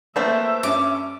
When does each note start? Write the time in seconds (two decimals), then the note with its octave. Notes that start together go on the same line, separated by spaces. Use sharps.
0.16 F3 A3 A#3 C4 B4 E5
0.63 G2 C#4 D6